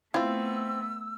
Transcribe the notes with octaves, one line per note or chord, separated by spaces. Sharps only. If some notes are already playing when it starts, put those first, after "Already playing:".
A3 B3 C4 E4 F4 E6